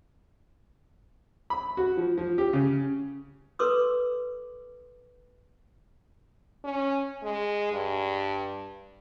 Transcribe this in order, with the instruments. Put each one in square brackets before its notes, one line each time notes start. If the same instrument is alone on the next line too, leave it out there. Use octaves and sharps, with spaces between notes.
[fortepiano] B5
F#4
F3
F3
G4
C#3
[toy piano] A4 B4 C6 D6 E6
[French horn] C#4
G#3
G2